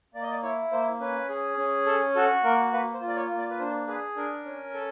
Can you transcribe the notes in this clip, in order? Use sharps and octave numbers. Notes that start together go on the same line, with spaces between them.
A#3 D5
D#5
D5
E4 C#5
A#3 C5
C#4 B4
G#4
C#4
A4
F#4 A4
A#3 A#4
A#3 B4
C5
F4
D5
C#5
A#3
D5
B4
D4 C5
G#4 B4
D4 A#4
C#4
A4